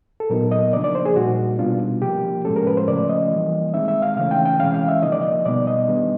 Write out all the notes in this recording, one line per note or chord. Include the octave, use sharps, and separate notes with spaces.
A4
A#2 F#3 B3 D#4 A#4
D#5
C#3 F3 A#3 D4 D5
D5
C5
G#4
A#2 G3 A#3 D#4 F#4
B2 G3 B3 D4 F4
C3 F3 A#3 G4
A2 F3 G#3 C#4 A4
A#4
B4
C5
C#3 F3 A3 C#4 D5
D#5
E3 G3 A#3
D#3 G#3 C4 D#4 E5
E5
F5
C#3 E3 A3 C#4 F5
G5
G5
C3 E3 G#3 C#4 F5
F5
E5
D3 F3 A#3 D#4 D#5
D5
D#5
B2 G3 B3 D#4 D5
D#5
D#3 G3 B3 D4